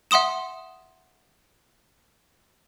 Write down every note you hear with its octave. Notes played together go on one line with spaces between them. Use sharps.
E5 F#5 C6 D#6 E7